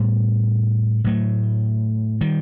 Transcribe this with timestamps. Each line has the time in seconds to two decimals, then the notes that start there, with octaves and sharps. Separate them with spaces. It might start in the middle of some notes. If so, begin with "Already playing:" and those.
Already playing: A2 G3 B3
1.04 A2 F#3 A3
2.21 D#3 G3